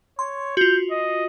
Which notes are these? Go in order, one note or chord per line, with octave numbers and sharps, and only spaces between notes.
C#5 C6
F4 F#4 G6
D#5